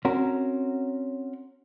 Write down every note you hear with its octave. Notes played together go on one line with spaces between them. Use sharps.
C4 C#4 F#4 A#4